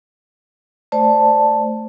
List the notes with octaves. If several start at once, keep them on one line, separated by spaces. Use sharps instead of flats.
A3 C5 D5 A5